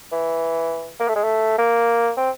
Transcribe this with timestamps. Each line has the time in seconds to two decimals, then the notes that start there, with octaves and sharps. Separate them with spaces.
0.12 E3
1.00 A#3
1.08 A3
1.16 G#3
1.24 A3
1.58 A#3
2.17 C4